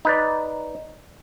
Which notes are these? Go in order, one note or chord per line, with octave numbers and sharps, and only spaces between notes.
D#4 B4 D5